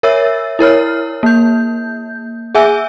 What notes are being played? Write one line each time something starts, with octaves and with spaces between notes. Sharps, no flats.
A#4 C#5 E5 E6 A6
E4 A#4 C#5 F6
A#3 G6
G#4 E5 G#5 E6